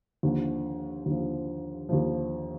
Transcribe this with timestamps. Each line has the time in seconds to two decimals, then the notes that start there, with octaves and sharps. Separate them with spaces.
0.23 D#2 D3 F3
1.06 D#2 D3 F3
1.89 D#2 D3 F3